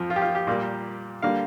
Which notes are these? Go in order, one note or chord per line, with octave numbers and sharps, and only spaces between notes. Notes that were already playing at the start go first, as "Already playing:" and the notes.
Already playing: F2 F3
F4
G4
F4
G4
A#2 G3 A#3
D3 G3 A#3 F5